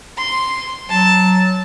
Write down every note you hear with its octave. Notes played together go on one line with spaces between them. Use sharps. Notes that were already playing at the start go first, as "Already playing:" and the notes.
C6
F#3 A5